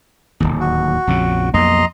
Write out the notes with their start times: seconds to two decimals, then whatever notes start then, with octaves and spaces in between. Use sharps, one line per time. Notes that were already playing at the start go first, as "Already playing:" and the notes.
0.40 D1 G#1 D#2
0.60 F#4
1.07 A#1 F2 C#3
1.54 B1 F2 A#3 D#5 A#5 C6